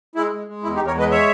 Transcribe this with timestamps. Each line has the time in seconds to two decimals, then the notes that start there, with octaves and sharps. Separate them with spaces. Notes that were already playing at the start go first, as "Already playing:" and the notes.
0.15 G#3 E4
0.31 G#3
0.47 G#3
0.63 E2 E4
0.75 D#4 G4
0.79 E2
0.87 A#4 C#5
0.95 G#3 B4 D#5
1.11 C#5 E5